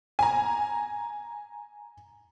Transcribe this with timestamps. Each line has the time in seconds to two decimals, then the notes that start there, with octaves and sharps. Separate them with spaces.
0.19 G#5 A#5